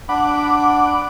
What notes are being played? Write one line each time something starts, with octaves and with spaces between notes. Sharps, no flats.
D4 F#5 B5 D6